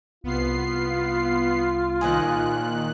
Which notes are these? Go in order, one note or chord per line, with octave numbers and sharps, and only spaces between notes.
C2 B3 F4 C7
A#2 D#3 G#4 C5 D#5 F#6